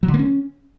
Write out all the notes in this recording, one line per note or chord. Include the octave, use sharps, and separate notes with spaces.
F#3
D3
A#3
C#4